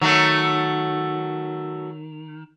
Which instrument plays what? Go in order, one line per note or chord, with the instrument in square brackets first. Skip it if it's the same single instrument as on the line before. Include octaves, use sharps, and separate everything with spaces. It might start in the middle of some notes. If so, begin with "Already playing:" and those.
[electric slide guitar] D#3 [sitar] F#3 A3